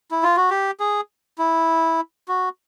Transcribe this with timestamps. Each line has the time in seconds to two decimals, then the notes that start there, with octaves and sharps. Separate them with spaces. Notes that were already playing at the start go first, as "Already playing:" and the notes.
0.11 E4
0.23 F4
0.37 F#4
0.50 G4
0.80 G#4
1.38 E4
2.28 F#4